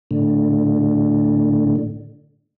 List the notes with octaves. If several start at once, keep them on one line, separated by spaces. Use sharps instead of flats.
A2 D3